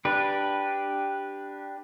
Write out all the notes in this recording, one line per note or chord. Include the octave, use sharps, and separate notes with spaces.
D4 G4 B4